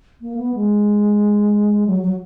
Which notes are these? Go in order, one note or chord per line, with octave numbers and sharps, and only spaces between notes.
A#3
B3
G#3
F#3
F#3